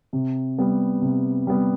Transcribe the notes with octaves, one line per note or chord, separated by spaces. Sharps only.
C3
G3 B3
C3
G3 B3